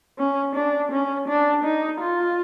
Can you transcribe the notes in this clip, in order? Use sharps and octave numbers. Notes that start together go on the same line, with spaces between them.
C#4
D4
C#4
D4
D#4
F4